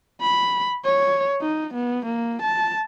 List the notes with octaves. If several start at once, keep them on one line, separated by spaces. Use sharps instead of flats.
B5
C#5
D#4
B3
A#3
A5